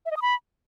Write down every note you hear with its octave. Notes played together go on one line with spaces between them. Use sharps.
E5
D#5
D#6
B5